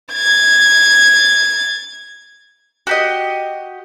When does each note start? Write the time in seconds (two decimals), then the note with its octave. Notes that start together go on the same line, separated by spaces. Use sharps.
0.13 G#6 A6
2.87 F#4 G4 D#5